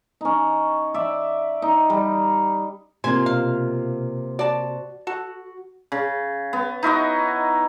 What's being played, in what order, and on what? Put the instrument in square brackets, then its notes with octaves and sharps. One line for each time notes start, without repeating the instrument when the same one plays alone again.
[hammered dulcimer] C#4 D#4
D5 E5
D#4
G3
[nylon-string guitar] C3 A#3 F4 [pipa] G#5 [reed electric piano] C6
[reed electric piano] B2 [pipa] F5
[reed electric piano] F#4 [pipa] D5 A5
[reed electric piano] F#4 [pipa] A4
[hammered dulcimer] C#3
B3
D#4 E4 F#4 D#5